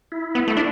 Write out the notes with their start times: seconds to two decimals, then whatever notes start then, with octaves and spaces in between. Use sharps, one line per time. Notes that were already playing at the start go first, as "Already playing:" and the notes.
0.12 E4
0.35 B3
0.48 A3
0.57 D4